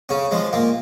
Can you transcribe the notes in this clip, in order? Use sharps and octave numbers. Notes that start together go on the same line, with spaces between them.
C#3 C#4
F3 G#3
A#2 A#3